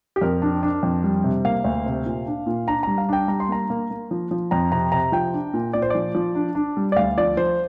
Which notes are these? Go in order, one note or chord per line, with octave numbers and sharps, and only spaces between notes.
G4
F2 A#4
D4
D4
F2
G3
C3
A#3 F5
D2
C3
A#2
D4
A#2
D4 A#5
G3 A#5
F5
D4 G5
G3 A#5
C6
A#3 A#5
A#3
A#3
F3
F3
F2 A#5
C3 A#5
C3 A#5
F3 G5
D4
A#2
A#2 D5
C5
F3 D5
F3
D4
D4
G3
D5
D2 F5
F3 D5
F3 C5